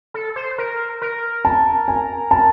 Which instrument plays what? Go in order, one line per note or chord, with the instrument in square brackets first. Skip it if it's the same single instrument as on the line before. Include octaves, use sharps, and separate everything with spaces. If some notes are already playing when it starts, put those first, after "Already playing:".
[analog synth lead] A4
C5
A#4
A#4
[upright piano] A5
G#5
A5